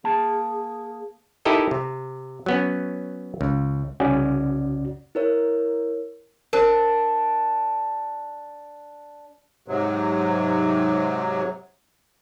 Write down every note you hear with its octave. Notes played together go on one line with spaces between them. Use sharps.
A#3 G#4 A5
D#4 E4 G4 A4 A#4 D#5
C3
F#3 B3 C#4
C#2
C2 C#3 C#4 F#4 D5
E4 A#4 C#5
D4 A#4 C5
G#2 C3 F#3